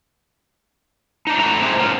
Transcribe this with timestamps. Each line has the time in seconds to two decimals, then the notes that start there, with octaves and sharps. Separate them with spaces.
1.27 D4 D#4
1.38 A2 A3 D4 F#4 A#5
1.62 C4 D#4 E4 G4 G#4 C5
1.79 A#3 B3 C#4 F4